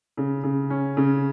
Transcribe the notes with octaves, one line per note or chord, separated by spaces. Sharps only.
C#3
C#3
C#4
C#3